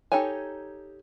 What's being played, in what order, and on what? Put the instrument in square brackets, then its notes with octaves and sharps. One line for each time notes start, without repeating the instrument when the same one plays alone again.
[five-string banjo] D#4 G4 A4 C#5 G#5